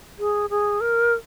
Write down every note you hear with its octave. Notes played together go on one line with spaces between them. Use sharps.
G#4
G#4
A#4